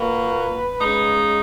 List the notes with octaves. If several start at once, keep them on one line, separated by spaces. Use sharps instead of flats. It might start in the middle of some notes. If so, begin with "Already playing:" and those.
Already playing: A#2 F#3 A#3 B4
C#3 G#3 D#4